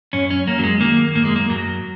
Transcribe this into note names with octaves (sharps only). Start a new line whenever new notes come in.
F#2 C#4
C#4
F#2 A#3
F#3
G#3
D#3 A#3
F#2 A#3
G#3
A#3
F#2 F#3